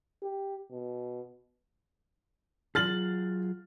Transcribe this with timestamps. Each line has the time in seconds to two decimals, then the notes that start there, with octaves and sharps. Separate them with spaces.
0.22 G4
0.72 B2
2.75 F#3 F4 G#4 F6 A6 F#7